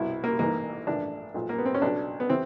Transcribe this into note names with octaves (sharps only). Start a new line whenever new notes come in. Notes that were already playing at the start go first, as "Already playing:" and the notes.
Already playing: C2 B2 E4
A#3
A1 G#2 E3 A#3
A#1 A2 E3 D4
B1 A#2 F3
A#3
B3
C4
C#4
B1 B2 D4
B3
E3 C4